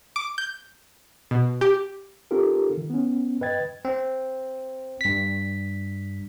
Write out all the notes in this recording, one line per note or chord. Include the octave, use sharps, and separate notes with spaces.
D6
G6
B2
G4
C4 D#4 F4 G4 A4 A#4
D#3
B3 C#4
G2 B4 D#5 G5 G#6 A6
C4
G2 B6